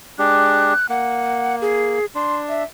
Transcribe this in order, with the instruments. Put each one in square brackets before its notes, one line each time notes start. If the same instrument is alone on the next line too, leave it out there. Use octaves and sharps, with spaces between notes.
[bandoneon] G#3 D4 G4 [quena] F#6
[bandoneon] A#3 [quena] F#5
[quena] G#4
[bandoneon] D4 [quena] C6
[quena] E5